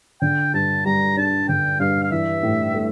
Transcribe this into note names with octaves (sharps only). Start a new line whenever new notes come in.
D3 G5
G2 A5
G3 A#5
D4 A5
D3 G5
G2 F5
F5
E3 E5
A2
A3